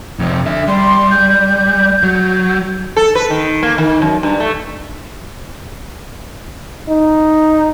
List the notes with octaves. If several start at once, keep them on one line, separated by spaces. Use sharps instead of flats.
F2 C3
D3 E5
G3 C6
G6
F#3
A4
B4
D#3
A#3
D#3
F#2
G2
A3
D#4